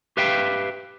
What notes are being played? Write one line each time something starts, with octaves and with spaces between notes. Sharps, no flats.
G4 B4 E5 F5 G5